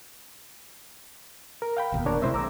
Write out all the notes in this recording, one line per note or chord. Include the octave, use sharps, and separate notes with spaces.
A#4
F5 G5 B5
F1 D#2 B2
D4 A#4 C#5
C3 G#3 C4 E4 C5 E5
B1 G#3 A#5 D6 E6